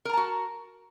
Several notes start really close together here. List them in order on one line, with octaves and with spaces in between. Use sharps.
A#4 A#5 A5 F#4